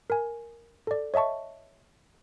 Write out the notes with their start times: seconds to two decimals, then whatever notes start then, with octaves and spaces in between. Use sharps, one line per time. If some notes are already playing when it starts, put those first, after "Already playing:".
0.10 A#4 G#5
0.87 A4 D5
1.14 C#5 D#5 E5 A5 C#6